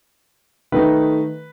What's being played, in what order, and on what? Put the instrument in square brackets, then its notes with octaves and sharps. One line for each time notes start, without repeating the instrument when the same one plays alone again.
[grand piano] D#3 A3 D#4 B4